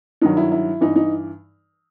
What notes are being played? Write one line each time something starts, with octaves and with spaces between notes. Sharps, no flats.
G2 D#3 F#3 D#4
E4
E4
G2 E3 D#4
D#4